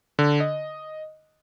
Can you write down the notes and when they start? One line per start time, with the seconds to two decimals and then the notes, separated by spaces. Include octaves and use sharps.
0.19 D3
0.40 D#5